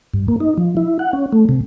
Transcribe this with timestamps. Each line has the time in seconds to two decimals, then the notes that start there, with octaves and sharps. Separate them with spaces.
0.14 G2
0.28 A#3
0.40 D#4
0.58 F3
0.77 E4
0.99 F#5
1.13 C#4
1.33 A3
1.49 C3